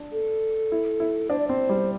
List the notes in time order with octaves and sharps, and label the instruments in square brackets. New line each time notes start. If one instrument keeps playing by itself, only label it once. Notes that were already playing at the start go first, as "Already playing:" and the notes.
Already playing: [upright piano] D4
[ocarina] A4
[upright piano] E4
E4
[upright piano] D4 [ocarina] C5
[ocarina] D5
[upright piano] C4 [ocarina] C5
[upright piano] G3